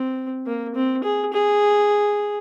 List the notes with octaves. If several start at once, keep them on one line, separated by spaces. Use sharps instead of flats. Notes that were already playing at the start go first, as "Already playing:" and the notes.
Already playing: C4
A#3
C4
G#4
G#4